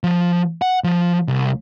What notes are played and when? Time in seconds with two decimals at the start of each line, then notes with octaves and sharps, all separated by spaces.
0.04 F3
0.62 F#5
0.84 F3
1.28 C2